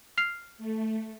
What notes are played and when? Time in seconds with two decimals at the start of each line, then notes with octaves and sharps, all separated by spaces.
0.18 F6 C7 F7
0.58 A3